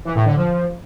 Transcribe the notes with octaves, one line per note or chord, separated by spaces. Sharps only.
E3
A2
D3
F3